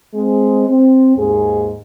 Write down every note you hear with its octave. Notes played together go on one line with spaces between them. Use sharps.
G#3 C4
C4
D#2 G#2 G#4